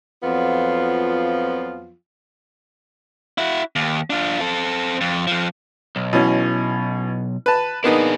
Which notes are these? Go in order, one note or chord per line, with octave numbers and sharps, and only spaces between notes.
F2 F3 F#3 B3 F4
E4 F#4
D#2
D4 F4
C4 A4
F2
F2 F3
B1
B2 E3 C#4
B4 A5
A#3 B3 D4 D#4 G#4